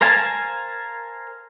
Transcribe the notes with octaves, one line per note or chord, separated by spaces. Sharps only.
A#4 C5 F5 G#5 A5